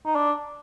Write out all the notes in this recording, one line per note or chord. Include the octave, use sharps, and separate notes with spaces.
D#4
D4